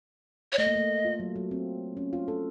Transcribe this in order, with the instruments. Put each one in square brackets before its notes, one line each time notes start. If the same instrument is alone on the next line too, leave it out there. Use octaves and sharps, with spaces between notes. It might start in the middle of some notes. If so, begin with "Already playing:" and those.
[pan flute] C#5
[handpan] A3 [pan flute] D#5
[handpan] A#3
A3
F4
F#3
F#3
C4
C#4
F4
A4